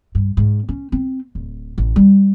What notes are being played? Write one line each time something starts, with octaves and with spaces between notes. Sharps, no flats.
G2
G#2
C#4
C4
D1
A1
G3